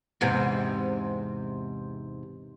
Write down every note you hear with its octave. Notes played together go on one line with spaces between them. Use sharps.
E2 G#2 C3